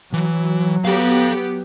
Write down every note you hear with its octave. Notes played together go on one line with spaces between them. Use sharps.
E3 F#3
B3 G4 A4 F5